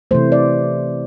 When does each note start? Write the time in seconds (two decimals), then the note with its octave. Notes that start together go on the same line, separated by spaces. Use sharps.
0.11 C3 E3 A3 C5
0.32 D5